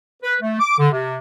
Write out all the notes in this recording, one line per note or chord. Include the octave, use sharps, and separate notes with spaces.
B4
A3
D6
D3
C3